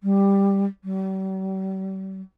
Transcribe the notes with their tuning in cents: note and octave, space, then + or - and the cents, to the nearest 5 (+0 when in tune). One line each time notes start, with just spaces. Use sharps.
G3 +10
G3 -45